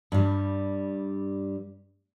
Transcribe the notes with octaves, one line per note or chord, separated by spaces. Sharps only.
G2 G3